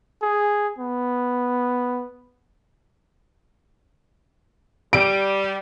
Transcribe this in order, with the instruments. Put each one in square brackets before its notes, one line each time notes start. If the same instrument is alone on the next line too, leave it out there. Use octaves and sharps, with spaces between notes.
[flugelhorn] G#4
B3
[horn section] G3 [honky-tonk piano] D7